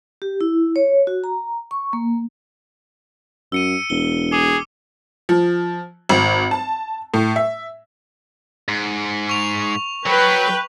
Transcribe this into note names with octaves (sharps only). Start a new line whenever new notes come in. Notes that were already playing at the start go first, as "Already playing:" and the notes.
G4
E4
C#5
F#4
A#5
C#6
A#3
F#2 E6 C#7 D#7
E1 G7
G#4 D6
F3
G#1
A5
A2
E5
G#2
C#6 F7
F#3 B4 G5